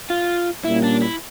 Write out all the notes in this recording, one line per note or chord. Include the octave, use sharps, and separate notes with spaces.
F4
A#2 G3 A#3 C#4 E4
D4
E4